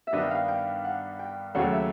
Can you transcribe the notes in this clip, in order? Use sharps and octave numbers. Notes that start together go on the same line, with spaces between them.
E5
G2 D#3 G3 B3 D4 D#5
G5
F5
G5
F#5
G5
D#2 C#3 F#3 A3 C#4 F#5
E5